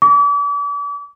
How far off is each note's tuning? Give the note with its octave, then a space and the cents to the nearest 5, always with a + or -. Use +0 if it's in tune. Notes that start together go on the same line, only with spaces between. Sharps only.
D6 -40